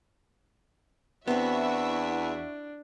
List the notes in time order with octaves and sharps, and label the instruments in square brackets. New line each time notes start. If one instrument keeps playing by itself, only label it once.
[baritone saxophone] E2 [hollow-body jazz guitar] B3 C4 [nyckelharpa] D4 [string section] E4 F#4 E5